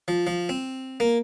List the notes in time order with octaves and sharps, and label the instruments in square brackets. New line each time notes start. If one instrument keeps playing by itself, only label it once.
[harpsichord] F3
F3
C4
A#3